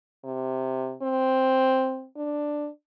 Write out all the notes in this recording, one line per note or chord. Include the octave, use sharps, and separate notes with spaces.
C3
C4
D4